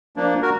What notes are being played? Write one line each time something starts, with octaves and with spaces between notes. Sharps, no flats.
F3 A#3 D4
F#4 A#4